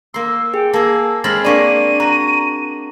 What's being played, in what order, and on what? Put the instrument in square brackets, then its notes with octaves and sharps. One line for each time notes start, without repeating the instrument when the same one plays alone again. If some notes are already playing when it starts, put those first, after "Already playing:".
[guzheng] A#3 C6 [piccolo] E6
[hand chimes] G#4 [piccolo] G5
[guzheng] A#3 G#4 [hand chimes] A5 [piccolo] E6
[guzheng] G#3 C4 B5 [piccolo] F6 [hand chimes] A6
[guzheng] A#3 D4 [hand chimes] D5 C#6 B6 [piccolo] D#7
[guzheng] F#4 [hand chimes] A#5 A#6